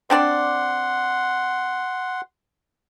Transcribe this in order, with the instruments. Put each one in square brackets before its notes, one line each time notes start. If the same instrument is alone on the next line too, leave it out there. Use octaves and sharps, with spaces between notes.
[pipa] C4 D4 D5 [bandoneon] F#5 C6